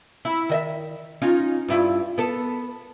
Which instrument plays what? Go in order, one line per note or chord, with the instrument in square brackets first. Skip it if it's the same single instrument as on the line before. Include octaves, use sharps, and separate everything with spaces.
[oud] E4
D#3 D#5 E5
C#4 D#4 F4
G2 E4 F4
B3 A4